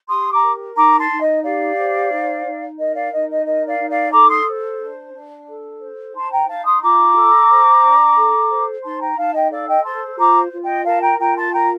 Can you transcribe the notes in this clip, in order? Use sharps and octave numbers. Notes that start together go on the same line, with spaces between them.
G4 C6 D#6
A#5 D6
A#4
D#4 A#5 D6
A5 C6
D#4
D#5
G4 D5 F5
C5
D#4
D#4
A#4 D#5
D5 F5
D#4 D#5
D#5
A#4 D#5
D5 F5
D#4
D5 F5
A4 A#5 D6
C6 D#6
C5
D4
D4
A4
C5
D#4 A5 C6
G5 A#5
D#4 F5 A5
C6 D#6
F4 A#5 D6
A4
C5
D4
A4
C5
D#4 A5 C6
G5 A#5
D#4 F5 A5
D#5 G5
A4 D5 F5
D#5 G5
C5 A5 C6
F4 A#5 D6
F4
D#5 G5
A#4 F5 A5
G5 A#5
F4 G5 A#5
A5 C6
A#4 G5 A#5